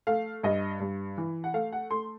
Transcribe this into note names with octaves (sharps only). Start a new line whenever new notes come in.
A3 F5
G2 D#5
G2
E3
F#5
A3 F5
F#5
A3 C6